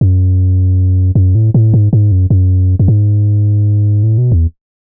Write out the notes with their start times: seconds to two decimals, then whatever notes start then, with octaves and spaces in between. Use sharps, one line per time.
0.01 F#2
1.15 F#2
1.35 A2
1.54 A2
1.74 G#2
1.93 G#2
2.12 F#2
2.30 F#2
2.79 F#2
2.88 G#2
4.03 A2
4.18 B2
4.32 E2